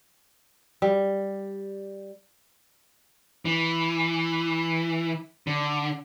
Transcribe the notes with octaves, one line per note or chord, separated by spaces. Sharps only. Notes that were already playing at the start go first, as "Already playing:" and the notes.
G3
E3
D3